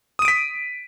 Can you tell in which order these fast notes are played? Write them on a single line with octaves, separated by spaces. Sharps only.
D#6 D#7 D7 B6